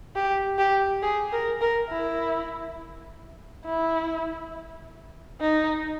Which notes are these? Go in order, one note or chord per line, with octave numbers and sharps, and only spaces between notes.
G4
G4
G#4
A#4
A#4
E4
E4
D#4